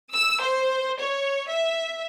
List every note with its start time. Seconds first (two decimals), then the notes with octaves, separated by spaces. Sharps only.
0.11 E6
0.42 C5
0.99 C#5
1.49 E5